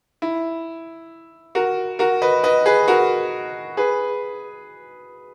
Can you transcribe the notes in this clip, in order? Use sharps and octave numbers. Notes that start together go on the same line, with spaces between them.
E4
F#4 A#4
F#4 A#4
B4 D#5
B4 D#5
G#4 B4
F#4 A#4
G#4 B4